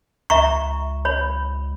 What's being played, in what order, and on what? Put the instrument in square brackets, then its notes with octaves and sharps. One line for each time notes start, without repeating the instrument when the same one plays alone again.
[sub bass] C#2 [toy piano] E5 A#5 C#6
[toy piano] C#5 B5